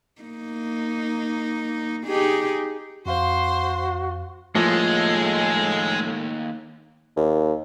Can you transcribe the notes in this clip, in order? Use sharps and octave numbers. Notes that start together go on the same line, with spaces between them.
A#3 D#4
D#4 G4 G#4
F2 F#4 C5 F5 C6
D#2 A2 F3 G#3 A#3 A4
D#2